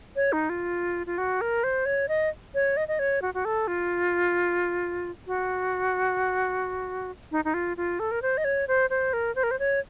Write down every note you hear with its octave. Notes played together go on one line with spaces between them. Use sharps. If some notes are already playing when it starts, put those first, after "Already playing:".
C#5
D#4
F4
F4
F#4
A#4
C5
C#5
D#5
C#5
D#5
D#5
C#5
F#4
F#4
A4
F4
F#4
D#4
D#4
F4
F4
A4
A#4
C5
D#5
C#5
C5
C5
A#4
C5
A#4
C5
C#5